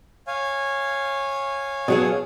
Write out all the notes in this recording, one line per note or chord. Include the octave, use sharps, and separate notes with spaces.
C#5 F5 G#5
B2 F#3 G#4